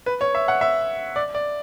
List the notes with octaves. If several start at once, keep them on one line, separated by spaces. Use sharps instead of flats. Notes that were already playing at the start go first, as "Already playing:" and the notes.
B4
C#5
E5
F#5
E5
D5
D5